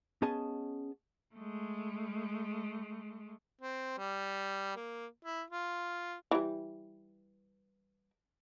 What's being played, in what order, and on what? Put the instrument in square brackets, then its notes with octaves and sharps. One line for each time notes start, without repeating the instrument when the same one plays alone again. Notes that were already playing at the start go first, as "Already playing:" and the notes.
[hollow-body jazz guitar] B3 C#4 G#4 D#5 A5
[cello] G#3 A3
[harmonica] C4
G3
A#3
E4
F4
[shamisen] E3 G3